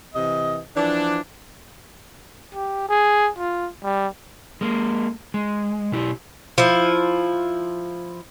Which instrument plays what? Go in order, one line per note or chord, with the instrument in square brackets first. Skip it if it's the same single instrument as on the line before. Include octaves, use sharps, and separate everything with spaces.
[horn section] C3 E3 D#5
E3 F3 D4
[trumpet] G4
G#4
F4
G3
[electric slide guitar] G#3 A#3
G#3
B2 E4 G4
[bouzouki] F3 E4